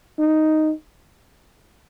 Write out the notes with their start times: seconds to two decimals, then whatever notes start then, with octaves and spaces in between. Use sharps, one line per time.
0.19 D#4